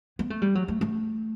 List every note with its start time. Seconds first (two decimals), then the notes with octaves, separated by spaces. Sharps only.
0.19 B3
0.30 A3
0.42 G3
0.55 F#3
0.68 A3
0.81 A3